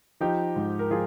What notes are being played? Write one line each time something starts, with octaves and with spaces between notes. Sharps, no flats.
F3 D#4 G4
G#2
A#4
F3 F4 G#4